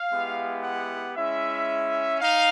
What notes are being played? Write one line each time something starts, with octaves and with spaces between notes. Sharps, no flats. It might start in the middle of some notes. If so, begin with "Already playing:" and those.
Already playing: F5
G#3 B3 E4 G4
F#5
G#3 C#4 E4 E5
D#4 F5